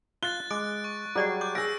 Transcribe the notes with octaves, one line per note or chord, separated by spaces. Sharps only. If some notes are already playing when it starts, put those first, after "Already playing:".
F4 F#6 A6 G7
G#3 D6 D7
C#6
F#3 G3 G#4 D5 F#5
D6 G6
G#4 E6 A#6 D7